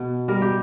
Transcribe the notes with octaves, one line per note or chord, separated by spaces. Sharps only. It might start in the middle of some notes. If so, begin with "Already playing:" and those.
Already playing: B2
G3 A#4
G4